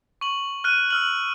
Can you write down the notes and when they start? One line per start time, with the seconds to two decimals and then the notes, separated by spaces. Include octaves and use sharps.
0.21 C#6 F#7
0.64 F6 F#6 D#7
0.90 E6 F6 F#7